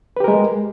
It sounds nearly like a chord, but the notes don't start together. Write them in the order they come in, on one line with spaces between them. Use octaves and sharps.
B4 G4 A#4 G#3